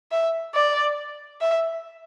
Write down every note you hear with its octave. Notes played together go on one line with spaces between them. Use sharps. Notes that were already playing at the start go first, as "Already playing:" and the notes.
E5
D5
E5